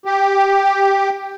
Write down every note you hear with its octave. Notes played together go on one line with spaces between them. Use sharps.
G4